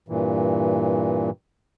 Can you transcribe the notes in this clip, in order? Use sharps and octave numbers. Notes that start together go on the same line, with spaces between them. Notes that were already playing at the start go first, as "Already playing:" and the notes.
G2 A#2 E3